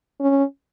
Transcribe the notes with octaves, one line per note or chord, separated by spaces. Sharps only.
C#4